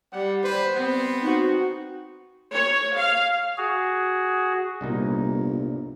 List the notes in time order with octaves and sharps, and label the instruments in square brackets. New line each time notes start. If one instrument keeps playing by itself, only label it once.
[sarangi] G3 [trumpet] F#5
[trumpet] B4 [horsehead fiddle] C5
[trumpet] B3 [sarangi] C4
[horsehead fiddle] D#4 F#4
[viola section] C#5
F5
[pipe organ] F#4 G#4
[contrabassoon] G1 [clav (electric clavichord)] C2 A#2 D#4